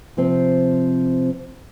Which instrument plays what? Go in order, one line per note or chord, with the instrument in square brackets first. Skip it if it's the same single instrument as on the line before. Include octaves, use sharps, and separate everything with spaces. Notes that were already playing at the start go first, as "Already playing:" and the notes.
[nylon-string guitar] C3 F3 C4